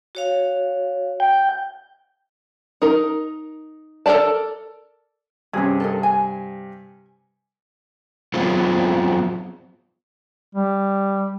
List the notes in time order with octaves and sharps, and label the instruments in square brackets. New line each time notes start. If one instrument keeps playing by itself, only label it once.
[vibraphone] F#4 C#5 F5
[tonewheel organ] G5
[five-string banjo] D#4 A#4
A4 A#4 C#5 D5 A5
[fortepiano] G2 C3 [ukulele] C#4 G#4
[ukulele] A4 A#4 D#5
G#5
[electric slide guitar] F#3 B3 C4 F4 G#4
[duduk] G3